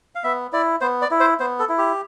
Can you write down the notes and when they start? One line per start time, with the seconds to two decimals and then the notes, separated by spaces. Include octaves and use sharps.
0.15 F5
0.24 B3 E5
0.53 E4 D5
0.81 B3 C5
1.02 D5
1.11 E4
1.20 C5
1.40 B3 C5
1.59 A4
1.69 E4
1.78 G4